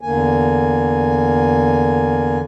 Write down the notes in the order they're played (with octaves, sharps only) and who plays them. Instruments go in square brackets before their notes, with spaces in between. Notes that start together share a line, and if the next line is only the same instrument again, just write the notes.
[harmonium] E2 D3 A#3 G#5